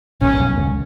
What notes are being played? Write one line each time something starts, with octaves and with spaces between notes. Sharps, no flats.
A#1 A#2 C#4
A#2
B1 B2
C#2 C#3